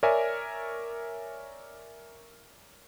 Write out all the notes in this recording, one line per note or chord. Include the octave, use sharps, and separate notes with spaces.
A#4 C#5 D5 E5 G#5